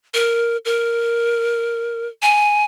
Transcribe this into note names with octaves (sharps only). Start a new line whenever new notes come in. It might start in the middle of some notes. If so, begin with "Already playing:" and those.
A#4
A#4
G#5